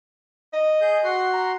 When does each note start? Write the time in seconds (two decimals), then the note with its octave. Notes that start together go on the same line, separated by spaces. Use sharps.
0.53 D#5
0.81 G#4 G6
1.04 F#4 F#5 C6
1.33 A#5